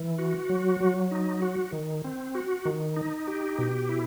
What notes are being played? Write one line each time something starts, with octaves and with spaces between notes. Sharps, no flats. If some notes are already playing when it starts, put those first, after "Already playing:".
Already playing: E3
F#4
F#3
F#3
D#4
F#4
D#3
C4
F#4
D#3
D#4
G4
B2
E4